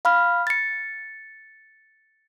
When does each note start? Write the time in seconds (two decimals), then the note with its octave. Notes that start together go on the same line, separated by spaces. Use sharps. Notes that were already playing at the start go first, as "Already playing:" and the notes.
0.05 F5 B5 F6
0.47 A6 C#7